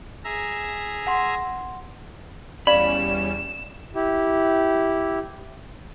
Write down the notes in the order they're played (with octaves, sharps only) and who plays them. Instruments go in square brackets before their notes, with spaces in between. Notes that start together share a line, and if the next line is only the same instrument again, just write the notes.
[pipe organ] G#4 E5 A#5
[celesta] F#5 C6
[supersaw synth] E2 G3 C#4 [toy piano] D5 F5 [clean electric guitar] B5 [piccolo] E7
[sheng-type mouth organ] E4 G4